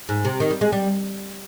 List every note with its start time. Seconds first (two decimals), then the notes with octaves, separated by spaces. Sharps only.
0.09 G#2
0.25 C3
0.40 D#3
0.51 G3
0.61 G#3
0.72 G3